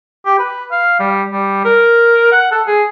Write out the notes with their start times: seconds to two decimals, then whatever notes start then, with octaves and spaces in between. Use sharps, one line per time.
0.26 G4
0.39 B4
0.71 F5
1.00 G3
1.32 G3
1.65 A#4
2.32 F#5
2.51 A4
2.67 G#4